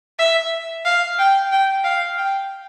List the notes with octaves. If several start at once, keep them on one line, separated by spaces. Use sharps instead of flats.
E5
F5
G5
G5
F5
G5